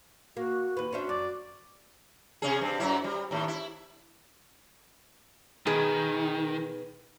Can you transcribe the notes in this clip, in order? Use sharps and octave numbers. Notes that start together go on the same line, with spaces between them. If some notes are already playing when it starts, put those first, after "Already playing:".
A#3 F#4
D#2 B4
C#4 D4 F#4 C5 E5
F#2 D5
C3 C#4 G#4
G2 C4
F#2 F#3 E4
G3
D#2 A2
E4
B2 D#3 B3 G#4